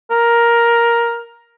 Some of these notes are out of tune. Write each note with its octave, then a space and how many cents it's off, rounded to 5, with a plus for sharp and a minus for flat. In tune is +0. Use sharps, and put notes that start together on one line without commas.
A#4 +10